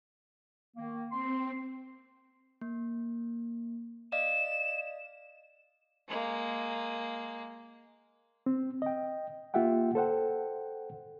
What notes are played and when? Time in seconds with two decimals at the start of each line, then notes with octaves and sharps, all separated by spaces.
0.76 D#3 A#3
1.11 C4 C6
2.61 A#3
4.12 D5 D#5 F5 E7
6.08 G#3 A#3
8.46 C4
8.82 D#5 G5
9.54 A#3 F4 G4 E5 F#5 G5
9.95 A4 C5 F#5 G5